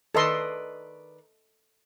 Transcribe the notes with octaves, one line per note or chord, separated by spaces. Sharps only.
D#3 A4 B4 D5 D#5 C6